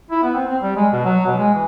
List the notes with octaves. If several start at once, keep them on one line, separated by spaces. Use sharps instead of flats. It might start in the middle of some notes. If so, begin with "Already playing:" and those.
E4
B3
C4
C4
G3
G#3
B2
F#3
B2
G#3
E3